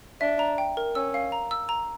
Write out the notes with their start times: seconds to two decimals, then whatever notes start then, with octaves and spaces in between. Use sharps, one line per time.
0.21 D4 E5
0.39 A#5
0.58 G5
0.77 A#4
0.95 C#4 E6
1.14 F5
1.32 A#5
1.51 E6
1.69 A#5